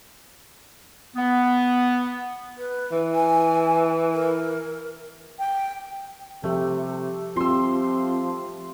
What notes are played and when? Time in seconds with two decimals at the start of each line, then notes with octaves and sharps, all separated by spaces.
1.16 B3
2.58 B4
2.92 E3
3.14 G#5
4.13 A#4
5.39 G5
6.44 C3 F3 A3 G4
7.36 F3 C4 F4 G4 C6 E6